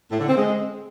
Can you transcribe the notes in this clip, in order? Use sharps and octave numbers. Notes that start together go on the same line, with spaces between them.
A2
D3
C4
G#3